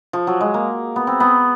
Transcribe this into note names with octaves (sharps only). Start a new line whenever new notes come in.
F3
F#3
G#3
A#3
B3
C4
B3